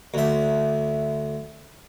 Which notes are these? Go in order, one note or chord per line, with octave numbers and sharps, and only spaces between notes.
D2 E5